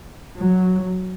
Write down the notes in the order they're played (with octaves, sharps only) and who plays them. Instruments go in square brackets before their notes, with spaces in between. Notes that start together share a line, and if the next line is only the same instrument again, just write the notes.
[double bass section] F#3